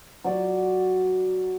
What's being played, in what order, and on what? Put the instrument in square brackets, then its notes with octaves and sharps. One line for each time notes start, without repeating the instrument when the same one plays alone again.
[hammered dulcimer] F#3 D5